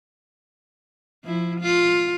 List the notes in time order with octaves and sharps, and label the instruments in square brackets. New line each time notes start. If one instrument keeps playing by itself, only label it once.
[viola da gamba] F3 E4
F4